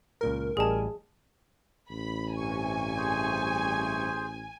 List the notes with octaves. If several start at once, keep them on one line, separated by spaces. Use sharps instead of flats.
C#2 A#2 A#4 A#5
A1 G3 G#4 D#5 G#5 A5
A1 B5
G2 C3 G#5 C#6
G#4 C5